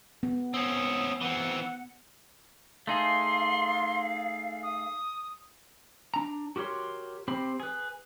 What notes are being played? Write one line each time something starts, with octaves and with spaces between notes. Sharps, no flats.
B3
C4 C#4 D#6
E3 C4 F#5
A3 D#4 G#4 F5 C6
D#6
D4 A#5
F#4 G4 A#4 C#5 C6
C4 G4 C5 B5
G#4 B4